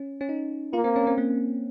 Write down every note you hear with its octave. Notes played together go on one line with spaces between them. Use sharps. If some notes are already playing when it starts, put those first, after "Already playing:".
Already playing: C#4
C#4
D#4
A#3 F4
C4
C#4
C4
A#3